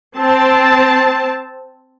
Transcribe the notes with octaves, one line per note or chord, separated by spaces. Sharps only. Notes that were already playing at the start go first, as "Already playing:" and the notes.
C4 A5